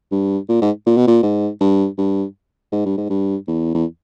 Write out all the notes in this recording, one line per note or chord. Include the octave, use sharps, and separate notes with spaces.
G2
A#2
G#2
A#2
B2
A#2
G#2
G2
G2
G#2
G2
G#2
G2
E2
E2